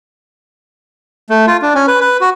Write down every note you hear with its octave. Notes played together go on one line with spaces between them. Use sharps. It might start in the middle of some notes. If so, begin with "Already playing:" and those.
A3
F4
D4
C#4
B4
B4
F#4